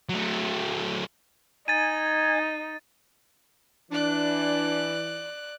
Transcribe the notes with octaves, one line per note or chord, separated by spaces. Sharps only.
F#3 A3
D#4 G#5 A6 D#7
E3 D4 D5 F#6